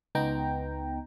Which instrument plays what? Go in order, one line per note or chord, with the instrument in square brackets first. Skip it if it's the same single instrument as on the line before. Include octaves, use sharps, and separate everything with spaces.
[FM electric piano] C#2 B3 D#4 G5 A#5